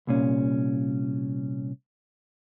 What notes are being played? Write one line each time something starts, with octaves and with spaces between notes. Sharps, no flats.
C2 A#2 C#4